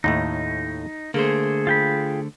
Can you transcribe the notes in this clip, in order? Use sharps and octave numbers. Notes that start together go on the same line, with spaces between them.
D#2 A2 A3 D#4
D3 A3 A#3 G#4 C5
F4 G5 B5